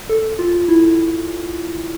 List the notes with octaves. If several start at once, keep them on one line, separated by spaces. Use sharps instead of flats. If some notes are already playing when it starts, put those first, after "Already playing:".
A4
F4
E4